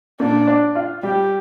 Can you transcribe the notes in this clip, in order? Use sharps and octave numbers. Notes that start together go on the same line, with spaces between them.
A#2 D4
D4
F4
G3 G4